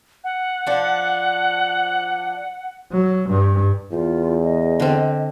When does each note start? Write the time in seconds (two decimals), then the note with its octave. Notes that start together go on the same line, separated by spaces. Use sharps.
0.24 F#5
0.67 F3 D4
2.92 F#3
3.30 G2
3.92 E2 F4
4.43 D#5
4.80 D3 C4